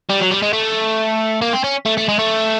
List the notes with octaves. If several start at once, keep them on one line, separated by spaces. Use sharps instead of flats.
G3
F#3
G3
G#3
A3
A#3
C4
C#4
A3
A3
G#3
A3